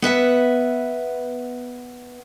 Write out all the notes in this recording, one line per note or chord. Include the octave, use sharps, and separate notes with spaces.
B3 B4 E5 F#5